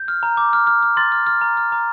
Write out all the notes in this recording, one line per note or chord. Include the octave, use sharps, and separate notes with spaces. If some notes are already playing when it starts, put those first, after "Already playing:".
Already playing: G6
F6
A#5
D6
F6
F6
F6
C6 A6
F6
F6
A#5
F6
A#5